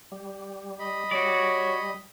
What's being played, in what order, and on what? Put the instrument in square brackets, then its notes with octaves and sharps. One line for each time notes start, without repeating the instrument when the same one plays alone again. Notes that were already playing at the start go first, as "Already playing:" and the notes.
[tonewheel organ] G3
[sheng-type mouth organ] D#5 B5
[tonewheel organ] G3 [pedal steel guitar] F#4 D5 [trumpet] C#5